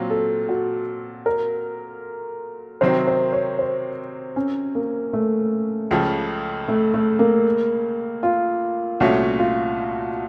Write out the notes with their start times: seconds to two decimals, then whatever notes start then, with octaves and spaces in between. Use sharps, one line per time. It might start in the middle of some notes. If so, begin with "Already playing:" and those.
Already playing: A#2 F#3 C4 F4
0.10 A4
0.49 F#4
1.26 A#4
2.81 C3 D#3 F#3 C4 C5
3.07 C5
3.33 C#5
3.59 C5
4.36 C#4
4.75 A#3
5.13 A3
5.91 C#2 C#3 F3
6.68 A3
6.94 A3
7.19 A#3
8.23 F4
9.00 C2 A#2 A3 C#4 F#4
9.39 F4